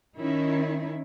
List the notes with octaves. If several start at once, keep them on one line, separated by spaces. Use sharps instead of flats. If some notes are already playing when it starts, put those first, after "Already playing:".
D#3 C#4 D#4 E4